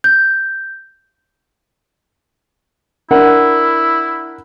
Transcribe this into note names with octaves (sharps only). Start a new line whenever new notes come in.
G6
D4 E4 A#4 F#5